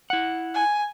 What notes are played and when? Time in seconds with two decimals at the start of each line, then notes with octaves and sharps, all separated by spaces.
0.10 E4 F#5
0.55 G#5